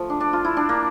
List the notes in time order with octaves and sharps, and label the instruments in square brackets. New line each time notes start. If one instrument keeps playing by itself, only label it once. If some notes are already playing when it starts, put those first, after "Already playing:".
Already playing: [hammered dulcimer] F3 A3
D4
D4
F4
E4
D4
A#3